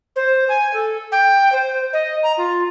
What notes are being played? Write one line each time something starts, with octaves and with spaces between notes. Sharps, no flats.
C5
G#5
A4
G5
C5
D#5
A#5
F4